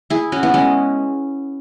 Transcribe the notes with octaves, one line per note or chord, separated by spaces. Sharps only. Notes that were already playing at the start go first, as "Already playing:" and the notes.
E4 G#4
C#4 F#4
B3 E4
G#3 C#4